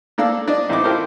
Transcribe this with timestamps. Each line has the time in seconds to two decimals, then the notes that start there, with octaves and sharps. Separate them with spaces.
0.18 A#3 D4 A4 F5 E6
0.47 D4 D5 D#5
0.69 A1 C4 D#4 E4 D6
0.84 E4 F4 G4 A4 A#4 C5